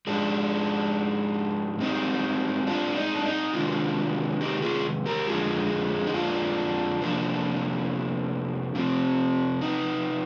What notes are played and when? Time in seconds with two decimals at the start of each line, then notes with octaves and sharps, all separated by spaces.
0.07 G#2 F3 G#3 D4
1.80 G#2 G3 C4 D#4
2.67 D4 F4
2.96 D#4
3.15 D4
3.26 D#4
3.53 C3 D#3 G#3 D4 F4
4.41 D#4 G4
4.62 F4 G#4
5.06 G4 A#4
5.27 F2 D3 G#3 F4 G#4
6.07 D#4
6.14 D4 F4
7.01 C3 F3 A#3 D4
8.75 C3 F3 C4
9.61 D#4